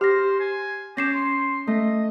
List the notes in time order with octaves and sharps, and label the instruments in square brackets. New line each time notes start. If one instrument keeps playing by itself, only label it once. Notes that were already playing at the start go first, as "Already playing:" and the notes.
[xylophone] G4 A#6 [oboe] C5 [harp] F6
[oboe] G#5
[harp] C#4 [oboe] G4 [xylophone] A#6 C7 E7
[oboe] C6
[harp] A3 [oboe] D#5